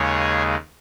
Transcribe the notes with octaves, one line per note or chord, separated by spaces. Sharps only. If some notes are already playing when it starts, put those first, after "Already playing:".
Already playing: D#2 C#3 G#3 G#4 C#5